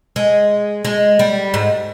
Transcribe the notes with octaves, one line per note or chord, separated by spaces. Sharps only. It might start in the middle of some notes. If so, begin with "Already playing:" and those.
G#3
G#3
G3
G#2